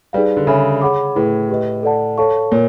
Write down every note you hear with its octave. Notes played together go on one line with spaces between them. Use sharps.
G3 D#4 G#4 B4 D5 F5
D3
C#3 A4 C#5 E5 G#5 B5
G#4 C#5 F#5 B5 D6
A2 E4 G#4 B4
G4 B4 D#5
A4 D5 F#5 A5
A4 C#5 F5 A5 C#6
A#2 A#4 C#5